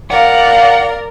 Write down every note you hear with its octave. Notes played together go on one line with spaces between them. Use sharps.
A#4 D5 F5 F#5